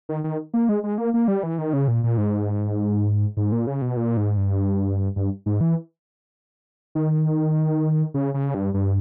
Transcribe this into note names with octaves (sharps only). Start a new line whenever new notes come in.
D#3
D#3
A#3
G#3
G#3
A#3
A#3
G3
E3
D#3
C#3
A#2
A#2
G#2
G#2
A#2
C#3
B2
A#2
G#2
G2
G2
G#2
E3
D#3
C#3
C#3
G2
G2